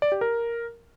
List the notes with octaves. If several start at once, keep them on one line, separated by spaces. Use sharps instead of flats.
D5
G4
A#4